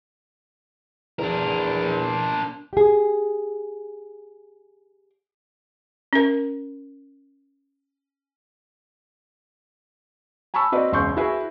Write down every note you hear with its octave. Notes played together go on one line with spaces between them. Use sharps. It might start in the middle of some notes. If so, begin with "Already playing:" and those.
E2 D4 A#4
G4 G#4
C#4 A#4
G#5 A5 B5 C#6 E6
C4 F#4 B4 C5 D5 D#5
E1 C#2 C#3 C6 C#6 G6
E4 F#4 G#4 B4 E5